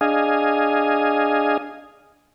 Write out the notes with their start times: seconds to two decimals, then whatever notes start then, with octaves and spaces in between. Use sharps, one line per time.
0.01 D4 G#4 D#5 F5 G#5